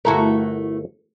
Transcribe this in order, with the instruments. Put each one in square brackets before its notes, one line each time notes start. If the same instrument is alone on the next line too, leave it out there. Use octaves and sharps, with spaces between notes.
[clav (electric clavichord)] G1 A4 A#4 [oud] A3 E4 F#4